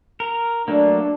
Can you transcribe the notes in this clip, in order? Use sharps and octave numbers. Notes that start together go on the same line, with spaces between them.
A#4
F#3 A3 A#3 D4